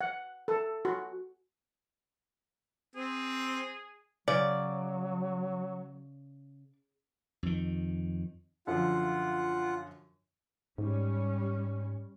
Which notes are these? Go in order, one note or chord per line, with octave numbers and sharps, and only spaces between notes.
F#5
A4
F#4
C4 G#4
C#3 F#3 D5
F2 D#3
F#2 D3 F3 F4 F#5
G#2 G3 C#4